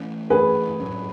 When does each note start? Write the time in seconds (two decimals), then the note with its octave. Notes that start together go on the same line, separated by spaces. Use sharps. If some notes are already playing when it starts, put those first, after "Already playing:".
Already playing: E3 A3 C#4
0.30 E3 A3 C#4 G#4 B4
0.81 A2 F#3 C#4